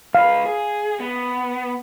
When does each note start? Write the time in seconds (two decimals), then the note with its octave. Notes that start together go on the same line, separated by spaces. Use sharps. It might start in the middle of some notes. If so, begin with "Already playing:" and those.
0.15 C#2 B4 F5
0.46 G#4
1.00 B3